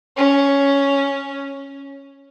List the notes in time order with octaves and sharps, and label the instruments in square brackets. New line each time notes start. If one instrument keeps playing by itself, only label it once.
[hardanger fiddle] C#4